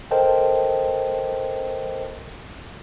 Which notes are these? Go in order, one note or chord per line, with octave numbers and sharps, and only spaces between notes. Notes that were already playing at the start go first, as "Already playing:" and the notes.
A4 A#4 C5 D#5 G5 A5